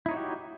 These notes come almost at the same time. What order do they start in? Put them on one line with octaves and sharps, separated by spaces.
E4 D#4 C#5 F#4 G4